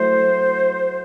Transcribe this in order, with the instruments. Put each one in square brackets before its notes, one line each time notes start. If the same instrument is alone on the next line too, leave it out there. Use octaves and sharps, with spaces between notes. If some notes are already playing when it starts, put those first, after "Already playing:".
Already playing: [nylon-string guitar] F#3 A3 E4 [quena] C5